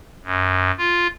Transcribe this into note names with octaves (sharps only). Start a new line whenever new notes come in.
F#2
F4